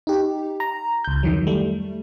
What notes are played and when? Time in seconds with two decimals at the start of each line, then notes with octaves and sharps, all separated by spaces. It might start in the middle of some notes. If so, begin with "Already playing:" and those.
0.07 D#4 G4
0.60 A#5
1.04 C#2 G6
1.23 F2 D#3 E3 F#3
1.47 G3 A3